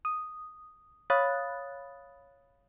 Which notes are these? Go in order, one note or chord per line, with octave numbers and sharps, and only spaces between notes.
D#6
C#5 F5 B5 D#6 F#6 A6